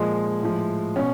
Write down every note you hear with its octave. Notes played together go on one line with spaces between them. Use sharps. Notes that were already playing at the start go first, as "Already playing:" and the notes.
Already playing: A#2 F3 G#3
A2 F3
B2 C#4